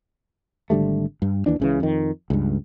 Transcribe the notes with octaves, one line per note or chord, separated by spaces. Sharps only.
G#1 D3 G3 A3
G2
D#2 E3 D4
C#2 C#3 E3
F2 D#3
C#2 G2